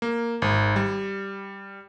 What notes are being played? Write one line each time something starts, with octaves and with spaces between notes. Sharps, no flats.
A#3
G#1
G3